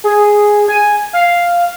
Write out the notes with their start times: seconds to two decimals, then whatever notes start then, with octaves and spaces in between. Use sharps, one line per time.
0.04 G#4
0.68 G#5
1.13 F5